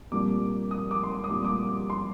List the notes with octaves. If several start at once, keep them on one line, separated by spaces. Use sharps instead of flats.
C2 A#2 G3 A#3 D6
D#6
D6
C6
D6
D#6
C2 A#2 G3 D6
D6
D#6
D6
C6